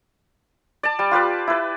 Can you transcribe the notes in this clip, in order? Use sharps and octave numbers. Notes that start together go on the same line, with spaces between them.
D5 A5
G3
F4 G4 B4 D5
E4 B4